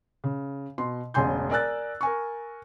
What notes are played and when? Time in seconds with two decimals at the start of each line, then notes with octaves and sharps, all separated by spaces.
0.24 C#3
0.78 B2 C6
1.14 E1 A1 C#3 G#5 C6 G6
1.50 A#4 D5 G#5 E6 F#6 A6
2.01 A#4 G#5 C#6